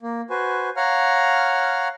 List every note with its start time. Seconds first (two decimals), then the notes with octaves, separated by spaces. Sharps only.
0.02 A#3
0.30 F#4 B4 C5 G#5
0.77 C#5 F5 F#5 A#5 F6